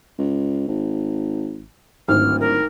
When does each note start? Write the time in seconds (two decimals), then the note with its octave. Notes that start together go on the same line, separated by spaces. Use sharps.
0.19 C#2
0.68 G#1
2.08 D1 G#1 F6
2.40 A#4